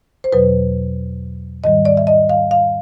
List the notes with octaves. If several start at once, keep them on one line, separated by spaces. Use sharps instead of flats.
C5
E2 B2 F#3 B4
G#2 D#3 G3 D#5
D5
E5
D#5
F5
F5